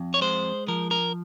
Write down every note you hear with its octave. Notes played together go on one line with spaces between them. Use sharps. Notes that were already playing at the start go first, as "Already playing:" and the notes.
Already playing: F2
C#5
G#3 C5
F3 A#4
A#4